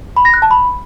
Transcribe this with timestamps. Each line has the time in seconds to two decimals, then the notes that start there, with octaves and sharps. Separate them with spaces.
0.16 B5
0.25 A#6
0.34 F#6
0.42 A5
0.51 B5